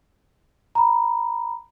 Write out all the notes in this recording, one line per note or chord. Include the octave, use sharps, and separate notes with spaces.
A#5 B5